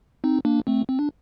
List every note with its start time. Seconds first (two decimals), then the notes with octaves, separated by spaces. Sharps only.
0.24 C4 D#4
0.45 A#3 D4
0.67 A3 C4
0.89 C4
0.99 D4